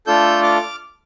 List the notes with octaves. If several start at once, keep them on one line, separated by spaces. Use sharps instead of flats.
A3 D4 F4 A4 E6 G6
D6 F6